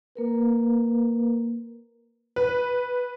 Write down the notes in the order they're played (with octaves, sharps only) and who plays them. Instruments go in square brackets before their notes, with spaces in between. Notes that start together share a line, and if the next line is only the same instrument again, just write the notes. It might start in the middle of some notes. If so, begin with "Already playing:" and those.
[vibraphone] A#3 A#4 B4
[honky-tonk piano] B4